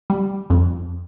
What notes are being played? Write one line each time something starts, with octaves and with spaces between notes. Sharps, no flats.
G3
F2